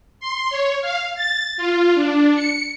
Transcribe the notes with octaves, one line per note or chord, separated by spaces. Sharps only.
C6
C#5
F5
A6
F4
D4
C#7